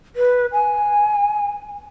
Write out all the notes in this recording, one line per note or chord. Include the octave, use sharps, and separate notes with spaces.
B4
G#5